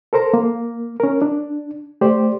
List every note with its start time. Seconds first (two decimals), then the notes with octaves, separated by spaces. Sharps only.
0.13 A4 A#4 C5 A#5
0.34 A#3
1.00 C#4 A#4
1.22 D4
2.01 A3 G4 C5 D5